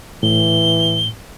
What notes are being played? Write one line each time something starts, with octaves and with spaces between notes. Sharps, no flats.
A2 E3 G7